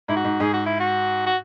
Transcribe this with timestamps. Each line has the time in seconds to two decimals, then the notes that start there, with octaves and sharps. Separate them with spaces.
0.08 G#2 E4
0.16 F#4
0.25 G#2
0.40 G#2 G#4
0.54 F#4
0.66 E4
0.80 F#4
1.26 F#4